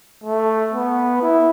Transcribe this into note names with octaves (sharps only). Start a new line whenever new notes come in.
A3
B3
E4